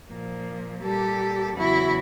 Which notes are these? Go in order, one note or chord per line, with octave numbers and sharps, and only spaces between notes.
A#2 F3 A#3
A#2 G3 A#3 G4 A4
E2 C#3 F#3 E4 F#4